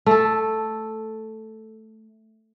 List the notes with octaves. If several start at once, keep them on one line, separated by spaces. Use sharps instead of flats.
A3 A4